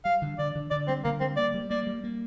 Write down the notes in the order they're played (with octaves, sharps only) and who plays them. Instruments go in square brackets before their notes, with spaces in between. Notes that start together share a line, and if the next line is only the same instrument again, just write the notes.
[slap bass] G3 [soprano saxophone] F5
[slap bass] D3
[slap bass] D3 [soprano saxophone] D5
[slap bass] D3
[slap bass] D3 [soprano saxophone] D5
[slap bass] G3 [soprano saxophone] C4
[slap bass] D3 [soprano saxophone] A#3
[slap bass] G3 [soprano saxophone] C4
[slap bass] A#3 [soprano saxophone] D5
[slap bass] G3
[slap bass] A#3 [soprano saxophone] D5
[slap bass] G3
A#3